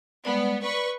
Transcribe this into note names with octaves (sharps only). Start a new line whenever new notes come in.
G3 G#3 B3 D5
B4 D5 C#6